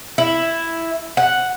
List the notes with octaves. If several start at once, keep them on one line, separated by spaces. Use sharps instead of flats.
E4
F#5